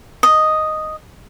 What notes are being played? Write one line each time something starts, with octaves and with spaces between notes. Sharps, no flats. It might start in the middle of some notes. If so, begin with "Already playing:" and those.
D#5